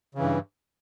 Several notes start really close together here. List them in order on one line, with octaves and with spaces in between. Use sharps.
C#3 E3 G2